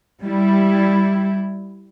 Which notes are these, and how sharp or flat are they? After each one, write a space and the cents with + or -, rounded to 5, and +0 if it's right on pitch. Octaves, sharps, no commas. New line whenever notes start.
G3 +0 E4 +0